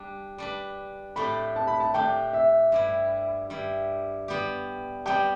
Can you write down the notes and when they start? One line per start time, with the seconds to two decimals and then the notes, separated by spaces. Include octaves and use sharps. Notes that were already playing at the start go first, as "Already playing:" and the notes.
Already playing: G3 D4
0.38 G3 D4 B4
1.16 A2 A3 D4 G4 B5
1.56 A5
1.67 B5
1.80 A5
1.94 A2 A3 D4 G4 G5
2.33 E5
2.72 G2 G3 E4
3.50 G2 G3 E4
4.28 G3 B3 G4
5.06 G3 B3 G4 G5